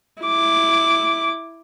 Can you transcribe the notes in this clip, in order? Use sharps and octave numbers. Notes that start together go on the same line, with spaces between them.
E4 D6